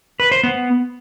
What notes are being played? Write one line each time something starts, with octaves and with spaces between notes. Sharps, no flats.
B4
C5
B3